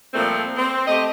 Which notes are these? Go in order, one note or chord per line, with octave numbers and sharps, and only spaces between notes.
A#2 F3 G3 A3 C4
C4
A3 G4 D#5